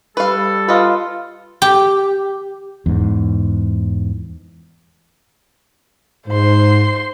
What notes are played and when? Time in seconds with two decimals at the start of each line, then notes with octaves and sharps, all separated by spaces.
0.17 G3 A4 B4 F5
0.68 F4 B4 D#5
1.62 G4
2.86 E2 G#2
6.28 G#2 C5 C6